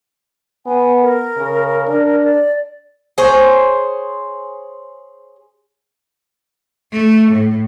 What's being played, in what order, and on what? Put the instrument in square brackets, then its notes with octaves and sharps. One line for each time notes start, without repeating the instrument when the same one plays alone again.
[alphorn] B3 [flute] G#5
[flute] A#4
[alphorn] C#3
D4
[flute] D5
[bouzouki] G#4 C5 C#5
[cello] A3
A2